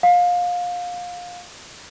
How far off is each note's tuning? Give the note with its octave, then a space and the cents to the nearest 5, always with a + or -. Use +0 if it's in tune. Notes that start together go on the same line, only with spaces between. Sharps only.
F5 +25